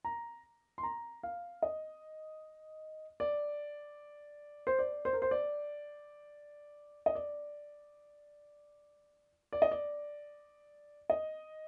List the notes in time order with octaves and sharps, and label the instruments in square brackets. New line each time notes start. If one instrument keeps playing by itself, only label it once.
[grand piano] A#5
C6
A#5
F5
D#5
D5
C5
D5
C5
A#4
C5
D5
D#5
D5
D5
D#5
D5
D#5